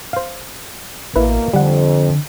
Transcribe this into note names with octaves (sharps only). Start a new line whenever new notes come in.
C5 F5
A1 B2 A#3 E4 B4
F2 D3 G3 F#5